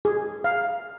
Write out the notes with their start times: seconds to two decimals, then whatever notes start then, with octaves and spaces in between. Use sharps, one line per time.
0.05 G#4
0.44 F5